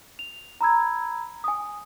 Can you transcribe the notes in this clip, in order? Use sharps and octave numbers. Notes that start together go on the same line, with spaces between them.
F7
A#5 B5 E6 G#6
G#5 D#6